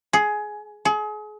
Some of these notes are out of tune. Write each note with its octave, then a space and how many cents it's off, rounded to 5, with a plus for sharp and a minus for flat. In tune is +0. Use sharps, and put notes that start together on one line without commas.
G#4 +15
G#4 +35